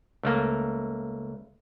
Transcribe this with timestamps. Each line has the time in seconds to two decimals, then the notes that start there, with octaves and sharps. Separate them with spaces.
0.23 C#2 A3 A#3